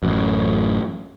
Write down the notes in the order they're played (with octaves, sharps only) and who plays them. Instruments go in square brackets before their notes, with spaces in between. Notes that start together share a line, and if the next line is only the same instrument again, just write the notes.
[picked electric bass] A1 F#2